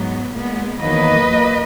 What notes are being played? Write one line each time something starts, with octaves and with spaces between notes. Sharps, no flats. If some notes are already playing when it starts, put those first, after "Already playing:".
Already playing: G#2 F#3 B3
A#2 G#3 B3
E2 D#3 F#3 A#3 B4 D#5
A#2 A#3